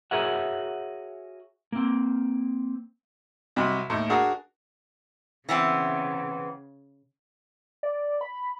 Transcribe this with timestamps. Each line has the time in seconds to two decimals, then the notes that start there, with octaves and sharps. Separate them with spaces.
0.11 F#4 G#4 A#4 C#5 E5 F#5
1.72 A#3 C4
3.56 C2 C3 F#3 D#5 B5
3.90 D#2 A2
4.10 D4 F#4 G#4 A#4 F#5
5.49 C#3 E3 B3 C4
7.83 D5
8.21 B5